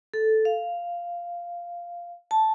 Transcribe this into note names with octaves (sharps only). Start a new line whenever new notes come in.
A4
F5
A5